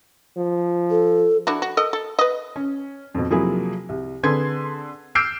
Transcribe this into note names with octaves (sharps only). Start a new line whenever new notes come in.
F3
A4
D4 E4 F#4
F#4
A4 A#4 D#5
A4
B4 D#5
C#4
F2 B2
C3 F3 F#3 A#3 E4 G#4
C2
D3 C4 G#4 B4 C6 G#6
D6 E6 F6 G6 C7 D7